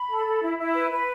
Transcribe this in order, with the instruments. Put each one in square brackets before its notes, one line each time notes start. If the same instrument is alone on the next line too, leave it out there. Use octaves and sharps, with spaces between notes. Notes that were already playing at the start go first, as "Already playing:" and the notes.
Already playing: [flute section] B5
A4
A4
E4
E4
B4
B4